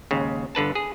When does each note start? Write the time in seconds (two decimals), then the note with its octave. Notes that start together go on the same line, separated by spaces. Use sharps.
0.11 D#2 G#2 C#3
0.55 G1 D3 B4 A5
0.75 G#4